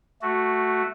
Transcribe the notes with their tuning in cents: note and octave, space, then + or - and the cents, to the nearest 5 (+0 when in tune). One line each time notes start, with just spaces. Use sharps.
A3 +0 F#4 +0